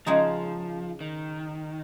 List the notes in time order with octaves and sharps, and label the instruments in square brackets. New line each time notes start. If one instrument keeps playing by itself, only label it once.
[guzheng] C#3 G#3 D#4 [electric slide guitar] F3
[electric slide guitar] D#3